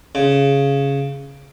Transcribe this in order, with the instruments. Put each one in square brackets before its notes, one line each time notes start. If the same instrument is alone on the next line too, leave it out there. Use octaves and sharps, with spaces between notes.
[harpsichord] C#3